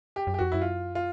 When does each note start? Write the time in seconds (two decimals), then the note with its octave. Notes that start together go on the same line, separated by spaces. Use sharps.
0.16 G4
0.27 F#2
0.34 G4
0.39 F2 F#4
0.52 F#2 E4
0.61 F4
0.95 F4